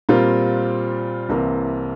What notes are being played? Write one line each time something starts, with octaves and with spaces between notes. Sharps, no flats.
A#2 G3 C4 F4 A#4
C2 C3 E3 A#3